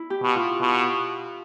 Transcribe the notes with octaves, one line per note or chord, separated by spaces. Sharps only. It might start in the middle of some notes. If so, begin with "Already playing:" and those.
Already playing: E4
G4
B2
F4
B2